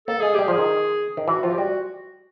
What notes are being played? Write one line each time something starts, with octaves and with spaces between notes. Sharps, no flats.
A#3 A4
G#3 G#4
G3 G4
F3 G#4
D#3
D#3
E3 F#4
F3 F4
G4
G3 F#4